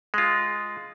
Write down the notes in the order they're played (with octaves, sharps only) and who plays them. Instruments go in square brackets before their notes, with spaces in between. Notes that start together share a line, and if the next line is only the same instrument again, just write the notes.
[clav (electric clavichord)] G#3 F4